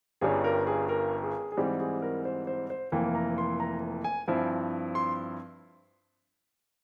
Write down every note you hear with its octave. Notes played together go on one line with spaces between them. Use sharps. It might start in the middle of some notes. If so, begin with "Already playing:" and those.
G1 G2 G3 C#4 G#4
A#4
G#4
A#4
G#4
G#4
G#2 E3 G3 C4 G4
G#4
A#4
C5
C5
C5
F1 F2 E3 A#3 F4 G5
A#5
C6
A#5
G#5
G2 F3 C4 E4
C6